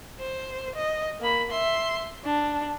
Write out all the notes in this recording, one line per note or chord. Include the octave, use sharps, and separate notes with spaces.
C5
D#5
A#3 B5
E5 C6
D4